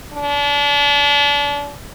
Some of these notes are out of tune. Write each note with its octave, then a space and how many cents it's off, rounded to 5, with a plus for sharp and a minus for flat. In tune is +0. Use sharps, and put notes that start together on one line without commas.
D4 -35